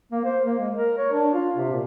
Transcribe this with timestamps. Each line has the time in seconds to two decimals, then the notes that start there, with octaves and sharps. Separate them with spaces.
0.12 A#3
0.25 C5
0.45 A#3
0.59 G#3
0.74 A#4
0.97 C#5
1.12 D4
1.33 F4
1.56 C3
1.72 A#2